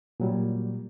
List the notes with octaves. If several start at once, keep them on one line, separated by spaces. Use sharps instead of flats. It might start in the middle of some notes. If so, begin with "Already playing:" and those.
A#2 F#3 G3